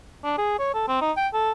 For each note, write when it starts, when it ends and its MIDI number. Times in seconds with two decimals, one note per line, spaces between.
0.24 0.33 62
0.38 0.56 68
0.59 0.72 73
0.74 0.86 69
0.88 1.01 60
1.01 1.12 63
1.17 1.28 79
1.34 1.52 69